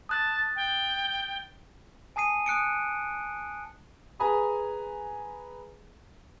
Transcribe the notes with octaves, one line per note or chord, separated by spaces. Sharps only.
A5 D#6 F#6 A6
G5
G#5 A5 D#6 C7 D#7
D#6 F#6 C#7 D7
G#4 B4 G#5 A#5 B5 D#6